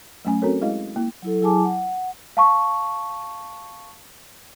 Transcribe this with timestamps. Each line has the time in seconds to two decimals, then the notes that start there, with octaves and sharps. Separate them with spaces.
0.25 F#3 A3 C#4 G#5
0.42 C4 C#4 F#4 A4 A#4 C#5
0.61 G#3 E4 G#4 D#5 F5
0.96 A#3 E4
1.22 F#3 E4 A4
1.41 F#3 E4 G#4 G#5 A5 D6
1.64 F#5
2.37 F5 A5 C#6